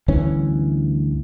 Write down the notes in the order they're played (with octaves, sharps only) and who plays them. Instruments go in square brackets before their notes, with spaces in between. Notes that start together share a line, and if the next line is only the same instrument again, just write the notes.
[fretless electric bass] D2 G2 E3 C#4